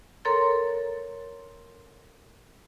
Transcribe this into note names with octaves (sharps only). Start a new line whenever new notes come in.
A4 A#4 C#5 A#5 C6 A6